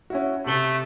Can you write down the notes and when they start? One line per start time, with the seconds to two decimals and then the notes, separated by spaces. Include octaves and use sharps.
0.10 C#4 E4 F#4
0.46 C3 A3 F#7 G7